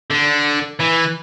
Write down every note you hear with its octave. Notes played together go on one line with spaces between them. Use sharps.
D3
E3